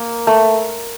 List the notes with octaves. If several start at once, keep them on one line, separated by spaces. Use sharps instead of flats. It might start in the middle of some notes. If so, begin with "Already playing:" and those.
Already playing: A#3
A3